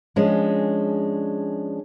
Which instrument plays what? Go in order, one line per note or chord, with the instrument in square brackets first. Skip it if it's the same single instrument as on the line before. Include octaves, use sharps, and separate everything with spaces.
[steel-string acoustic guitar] F3 G#3 C#4 D4